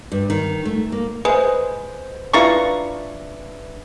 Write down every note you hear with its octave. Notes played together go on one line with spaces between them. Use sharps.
G2
D#3
A3
A#3
G#3 B4 C5
D4 E4 F4 B4 A#5 C#6